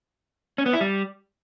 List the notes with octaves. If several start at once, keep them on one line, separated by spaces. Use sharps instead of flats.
C#4
B3
E4
G3